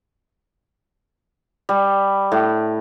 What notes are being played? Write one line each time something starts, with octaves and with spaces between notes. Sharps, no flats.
G3
A2